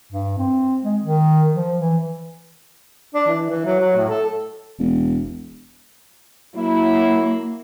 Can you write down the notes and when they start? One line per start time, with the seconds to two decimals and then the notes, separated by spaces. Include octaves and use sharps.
0.12 G2
0.39 C4
0.83 G#3
1.03 D#3
1.54 F3
1.77 E3
3.15 D4
3.28 E3
3.50 E3
3.66 F#3
3.79 F#3
3.96 A2
4.09 A4
4.79 E1
6.55 F#3 A#3 E4